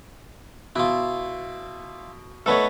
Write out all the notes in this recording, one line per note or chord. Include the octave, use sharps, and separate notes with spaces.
B2 E4 F4
A3 B3 D#4 A4 B4 C#5